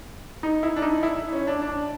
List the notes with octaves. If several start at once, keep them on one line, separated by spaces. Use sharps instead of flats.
D#4
E4
D4
D#4
E4
C#4
D4
D4